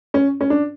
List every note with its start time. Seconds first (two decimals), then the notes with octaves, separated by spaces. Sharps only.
0.14 C#4
0.41 C#4
0.50 D4